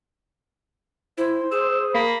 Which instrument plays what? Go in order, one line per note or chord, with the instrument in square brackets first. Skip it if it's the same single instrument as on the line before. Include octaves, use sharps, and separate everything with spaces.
[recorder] E4 [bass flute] C5
[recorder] G#4 [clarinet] E6
[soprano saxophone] A#3 [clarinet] B5